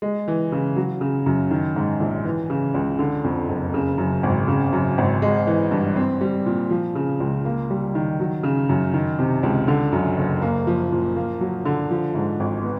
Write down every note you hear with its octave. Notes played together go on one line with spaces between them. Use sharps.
G#3
E3
C#3
F#3
C#3
F#2
D#3
G#2
A#1
E3
C#3
C#2
D3
F2
F#1
C#3
F#2
G#1
C#3
F#2
G#1
G#3
E3
G2
C4
G3
A#2
F3
C#3
C#2
A#3
G3
D#3
F#3
C#3
F#2
D#3
C3
C#2
D3
F#2
F#1
A#3
F3
A#2
A#3
F#3
D3
F3
G#2
G#1
B3